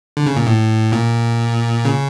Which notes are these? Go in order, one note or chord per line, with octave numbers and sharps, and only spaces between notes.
D3
C#3
A#2
A2
A#2
C#3